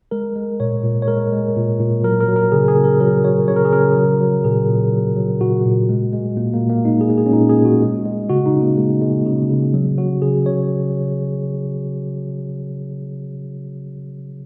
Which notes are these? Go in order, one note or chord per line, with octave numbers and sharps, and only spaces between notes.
G#3 A#4
G#3
A#2 C#5
A#2
C#5
G#3 A#4
G#3
A#2
A#2
F#3 A#4
A#4
F#3
A#4
C#3 G#4
G#4
C#3
A#4
F#3 A#4
F#3 C#5
C#3 C#5
A#4
G#4
C#3 A#4
F#3
F#3
A#2 G#4
A#2
F#3
F#3
A#2 F#4
A#2
G#3
G#3
A#2 A#3
A#3
A#2
A#3
G#3 D#4
G#4
G#3
G#4
C#4
A#2 D#4
G#4
A#2
F#4
G#3
G#3
C#3 F#4
D#4
C#3
A#3
G#3
G#3
C#3
C#3
F#3
F#3 F#4
C#3 G#4
C#3 C#5